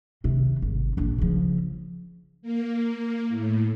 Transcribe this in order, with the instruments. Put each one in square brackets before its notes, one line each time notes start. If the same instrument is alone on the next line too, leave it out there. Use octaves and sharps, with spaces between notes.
[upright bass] C3 D#3
G#1
A#1 D4
C#3 F3
[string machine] A#3
A2